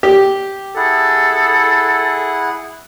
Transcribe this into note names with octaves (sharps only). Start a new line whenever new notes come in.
G4
E4 G#4 A4 F#5